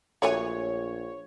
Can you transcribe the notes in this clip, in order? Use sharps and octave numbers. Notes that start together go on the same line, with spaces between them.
A#1 A3 F#4 C#5 G#5